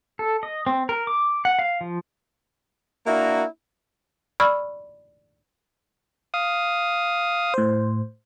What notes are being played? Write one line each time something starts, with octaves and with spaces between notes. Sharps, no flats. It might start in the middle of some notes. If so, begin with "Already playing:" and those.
A4
D#5
C4
A#4
D6
F#5
F5
F3
A#3 D4 E4 F#4 A#4
D5 B5 C#6 E6 F6 G#6
F5 D#6
A2 C5